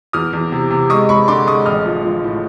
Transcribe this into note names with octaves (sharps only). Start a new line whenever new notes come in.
E2 D#6 F6
E2
C3
C3
G#3 C#6 D#6
G#3 B5 C#6
D3 C6 D6
G#3 C#6 D#6
A1 D#6 F6
F3
F3
A2